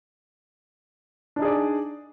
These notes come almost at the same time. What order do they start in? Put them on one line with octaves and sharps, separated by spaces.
D4 D#4 G#4 D5